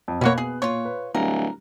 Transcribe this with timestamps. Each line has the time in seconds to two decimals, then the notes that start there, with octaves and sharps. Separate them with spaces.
0.08 F2
0.21 B2 A#3 C#4 F#4 C#5 B5 F#6
0.38 B3 G#4
0.62 A#2 F4 C#5
0.85 B4
1.15 D1 G3 A#4